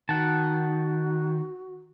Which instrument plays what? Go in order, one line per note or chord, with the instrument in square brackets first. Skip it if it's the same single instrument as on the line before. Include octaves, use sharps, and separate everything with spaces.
[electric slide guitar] D#3 [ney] F#4 [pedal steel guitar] F#5 A5